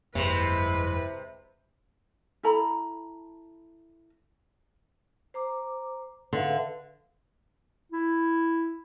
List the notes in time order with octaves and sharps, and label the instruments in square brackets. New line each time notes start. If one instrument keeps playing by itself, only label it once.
[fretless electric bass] G1 F2 A#3 [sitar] C3 C5 [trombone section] G#3 E4 [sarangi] B4
[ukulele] E4 A4 A#5 B5
[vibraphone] C5 A#5 D6
[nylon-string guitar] D3 [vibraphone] B4 E5 F5
[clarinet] E4